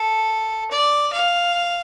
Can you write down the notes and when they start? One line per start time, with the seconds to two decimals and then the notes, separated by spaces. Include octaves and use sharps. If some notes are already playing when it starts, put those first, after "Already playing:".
Already playing: A4
0.71 D5
1.12 F5